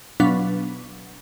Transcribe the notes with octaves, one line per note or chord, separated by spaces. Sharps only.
B2 F#3 B3 D4 F5 B6